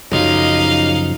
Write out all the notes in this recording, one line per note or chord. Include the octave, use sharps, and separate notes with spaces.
B1 F#2 C#3 F3 D#4 F5